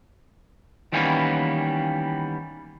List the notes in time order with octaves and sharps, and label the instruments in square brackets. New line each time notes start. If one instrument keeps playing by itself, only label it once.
[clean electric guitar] D#3 E3 G3 A#3 B3 C#4